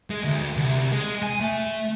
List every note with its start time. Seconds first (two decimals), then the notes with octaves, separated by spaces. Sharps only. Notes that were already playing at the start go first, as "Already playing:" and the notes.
0.10 G#3
0.24 D2
0.57 C2
0.92 G#3
1.23 G#5
1.41 A3